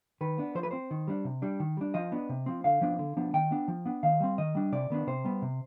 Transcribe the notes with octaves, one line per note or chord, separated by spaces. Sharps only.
D#3 B4
B3 D4
F3 C5
B4
C4 C5
D#3
G3 D4
C3
G3 D4
D#3
G3 D4
F3 D#5
B3 D4
C3
F3 C4
D3 F5
F3 B3 D4
D3
F3 B3 D4
D#3 G5
B3 D4
F3
B3 D4
D#3 F5
G3 C4
D#3 D#5
G3 D4
C3 D5
D#3 B3 D4
C3 C5
G3 B3
C3